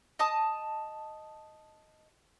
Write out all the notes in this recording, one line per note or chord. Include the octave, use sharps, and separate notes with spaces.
D#5 A5 D#6